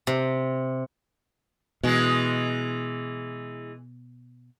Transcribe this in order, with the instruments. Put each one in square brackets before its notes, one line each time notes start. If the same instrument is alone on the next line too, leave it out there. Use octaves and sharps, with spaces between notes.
[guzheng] C3
[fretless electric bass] B2 [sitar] E3 G#3